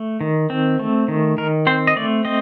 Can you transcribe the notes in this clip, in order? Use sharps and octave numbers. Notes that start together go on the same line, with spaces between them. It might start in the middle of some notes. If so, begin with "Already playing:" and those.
Already playing: A3
D#3
C4
A3
D#3
D#3 A#4
C4 C5
D#5
A3 D5
C4 D#5